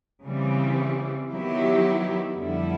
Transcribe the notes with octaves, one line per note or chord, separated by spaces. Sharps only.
C#3 E3 G3 C4
D#3 F#3 B3 E4 G4
F2 D3 G3 B3 E4